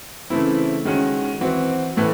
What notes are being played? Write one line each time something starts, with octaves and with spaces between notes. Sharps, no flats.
C#3 E3 A3 C4 E4
D#3 G#3 C#4 F#4
E3 C4 F#4
A2 E3 A3